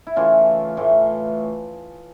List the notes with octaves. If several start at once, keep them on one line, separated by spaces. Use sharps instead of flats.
E4
C#3 E3 A3 F4
A2 E3 A3 F4